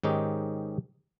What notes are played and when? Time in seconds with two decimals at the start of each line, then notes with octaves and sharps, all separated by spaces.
0.04 G#2 D#3 C#4 D#4 G4